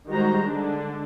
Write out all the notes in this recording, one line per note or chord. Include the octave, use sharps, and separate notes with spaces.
D#3 G3 G#3 F#4 C5 A#5
D3 G#3 D4